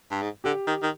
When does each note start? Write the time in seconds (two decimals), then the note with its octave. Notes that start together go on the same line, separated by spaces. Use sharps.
0.11 G2
0.22 G#2
0.44 D3 G4
0.67 D#3
0.82 D#3